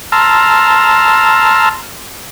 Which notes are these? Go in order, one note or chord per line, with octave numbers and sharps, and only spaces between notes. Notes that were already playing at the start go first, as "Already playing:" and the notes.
A5 A#5 C6 E6 F6